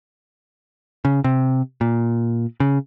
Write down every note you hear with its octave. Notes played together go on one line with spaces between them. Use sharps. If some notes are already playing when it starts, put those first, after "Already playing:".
C#3
C3
A#2
C#3